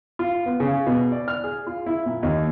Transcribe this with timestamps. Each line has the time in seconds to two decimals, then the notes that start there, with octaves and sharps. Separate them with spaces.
0.19 F4
0.46 B3
0.60 C#3
0.87 B2
1.12 D5
1.28 F6
1.44 G#4
1.67 F4
1.86 E4
2.06 A#2
2.23 D#2